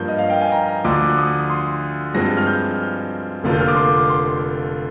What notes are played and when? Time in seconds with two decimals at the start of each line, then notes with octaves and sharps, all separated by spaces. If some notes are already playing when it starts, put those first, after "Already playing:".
Already playing: G2 F3 A#3 G6
0.08 D#5
0.19 F5
0.30 G5
0.41 G#5
0.52 A#5
0.84 D2 D3 F3 D6
1.17 D#6
1.50 C6
2.14 G2 F3 G#3 C4 A#6
2.37 F6
2.47 G6
3.44 F1 F2 D3 F3 A#3
3.52 G6
3.60 F6
3.68 D6
3.76 C6
4.09 C6